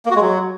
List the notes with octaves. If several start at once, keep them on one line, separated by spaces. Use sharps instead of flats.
A#3
F#4
G#3
F#3